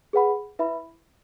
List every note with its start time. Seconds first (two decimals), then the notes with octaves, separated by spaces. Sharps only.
0.13 G#4 B4 F#5 B5
0.59 E4 B4 E5 B5